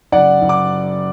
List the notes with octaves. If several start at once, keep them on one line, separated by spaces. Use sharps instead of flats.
F#1 D5 F#5
F#1
D6